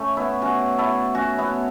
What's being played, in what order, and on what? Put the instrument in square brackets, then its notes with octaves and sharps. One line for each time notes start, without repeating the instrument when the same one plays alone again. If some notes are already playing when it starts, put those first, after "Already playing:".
Already playing: [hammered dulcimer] A3 C#4
B3 E4
C#4 F#4
E4 A4
C#4 F#4
B3 E4